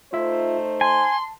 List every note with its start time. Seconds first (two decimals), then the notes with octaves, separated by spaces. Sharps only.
0.13 A3 D#4 F4 C5 E5
0.81 G#5 A5 C6